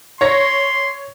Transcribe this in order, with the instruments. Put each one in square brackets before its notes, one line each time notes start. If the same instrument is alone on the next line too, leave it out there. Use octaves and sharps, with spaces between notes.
[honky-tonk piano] C#5 A#6 [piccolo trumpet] C6